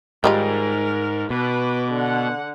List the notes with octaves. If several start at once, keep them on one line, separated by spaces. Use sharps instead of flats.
G#2 D#3 G3 F4 A#4
B2 B4 D6
D3 F#5